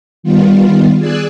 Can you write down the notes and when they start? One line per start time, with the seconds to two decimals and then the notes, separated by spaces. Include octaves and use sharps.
0.23 D#3 G3 B3 F4
0.97 G#4 D5 G#5 E6 F#6